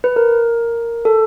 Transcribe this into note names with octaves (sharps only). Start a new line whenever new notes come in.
B4
A#4
A4